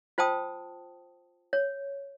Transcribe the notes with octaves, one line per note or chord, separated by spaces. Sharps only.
F4 C5 G5 A5 D#6
C#5